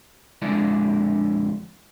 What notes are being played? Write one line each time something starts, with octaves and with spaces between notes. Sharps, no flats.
F2 D3 G#3 E4 D5